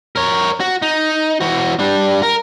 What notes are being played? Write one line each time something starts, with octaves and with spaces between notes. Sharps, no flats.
A#4 C#5
F#4
D#4
E3 F#4
G3 D4
A#4